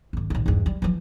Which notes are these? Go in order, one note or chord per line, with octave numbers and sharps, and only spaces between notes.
G#1 D#3
A1 D#3
E2 G2
G3
E3 F3